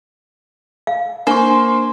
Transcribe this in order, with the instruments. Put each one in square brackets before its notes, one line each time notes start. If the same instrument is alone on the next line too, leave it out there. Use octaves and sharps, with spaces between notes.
[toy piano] F5
[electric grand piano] A#3 [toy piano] D4 C#6 [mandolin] C5